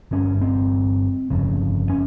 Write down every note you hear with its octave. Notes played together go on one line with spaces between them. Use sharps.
G1 G2 C#4
C4
G1 F2 C#3
C#4